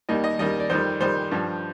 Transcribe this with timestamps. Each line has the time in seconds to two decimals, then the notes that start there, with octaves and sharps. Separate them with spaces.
0.09 D#2 D#3 G3 D#5
0.24 D#5
0.39 D#2 D#3 G3 D#5
0.60 D5
0.70 F2 D#3 G3 C5
1.00 F2 D#3 G3 C5
1.31 G2 F3